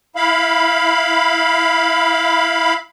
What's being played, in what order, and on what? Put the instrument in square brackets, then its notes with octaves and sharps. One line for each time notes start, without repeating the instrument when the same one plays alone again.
[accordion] E4 F5 B5